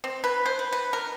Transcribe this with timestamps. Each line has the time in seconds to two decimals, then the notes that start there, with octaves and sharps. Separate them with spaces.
0.04 C4
0.24 B4
0.46 C5
0.59 B4
0.73 B4
0.93 A#4